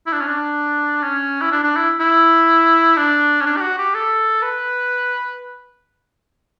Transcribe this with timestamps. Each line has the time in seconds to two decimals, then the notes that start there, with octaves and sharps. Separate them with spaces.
0.07 E4
0.13 D4
0.21 C#4
0.27 D4
1.03 C#4
1.41 E4
1.52 D4
1.64 D4
1.76 E4
2.00 E4
2.97 D4
3.41 C#4
3.46 D4
3.56 G4
3.61 F#4
3.78 G4
3.94 A4
4.42 B4